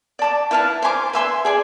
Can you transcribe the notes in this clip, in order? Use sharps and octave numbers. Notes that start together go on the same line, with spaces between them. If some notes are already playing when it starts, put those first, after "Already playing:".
D5 A5 D6
E4 B4 F5 A5
C5 G#5 B5 D6
B4 E5 G#5 C6
G#4 D5 G#5